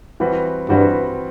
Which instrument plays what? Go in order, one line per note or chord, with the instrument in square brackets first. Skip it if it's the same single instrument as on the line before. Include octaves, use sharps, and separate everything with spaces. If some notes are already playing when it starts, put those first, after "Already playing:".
[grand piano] E3 G3 C4 F#4 B4
[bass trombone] G2 [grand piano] E3 G3 C4 F#4 B4